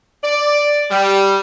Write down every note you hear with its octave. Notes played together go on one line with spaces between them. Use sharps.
D5
G3